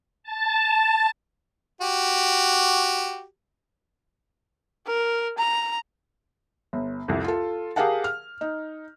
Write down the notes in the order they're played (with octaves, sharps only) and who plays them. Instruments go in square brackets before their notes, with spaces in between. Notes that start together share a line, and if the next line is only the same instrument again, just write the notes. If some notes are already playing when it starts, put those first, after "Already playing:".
[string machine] A5
[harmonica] F#4 G4
[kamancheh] A#4
A#5
[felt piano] G1
C2 F2
F4 A4
G4 G#4 A#4 F5 F#5 A5
F6
D#4